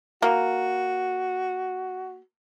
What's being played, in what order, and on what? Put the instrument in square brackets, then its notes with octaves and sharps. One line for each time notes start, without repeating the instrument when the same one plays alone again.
[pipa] A#3 [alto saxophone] F#4